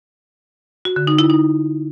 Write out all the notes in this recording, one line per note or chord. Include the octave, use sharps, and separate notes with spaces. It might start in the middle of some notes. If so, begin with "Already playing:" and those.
F#4
D3
D#4
E4
D#4